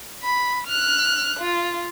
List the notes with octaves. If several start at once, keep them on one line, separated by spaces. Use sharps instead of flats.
B5
F6 F#6
F4